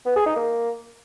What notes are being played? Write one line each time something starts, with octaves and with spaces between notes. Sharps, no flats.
B3
G#4
D#4
A#3